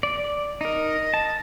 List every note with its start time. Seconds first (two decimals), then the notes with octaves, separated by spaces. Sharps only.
0.03 D5
0.61 D#4 A#4 D#5
1.14 A5